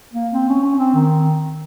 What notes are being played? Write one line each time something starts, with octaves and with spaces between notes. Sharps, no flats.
A#3
C4
C#4
C#4
C4
D#3